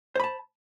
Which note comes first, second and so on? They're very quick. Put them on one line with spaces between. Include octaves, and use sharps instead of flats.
C5 B5 A5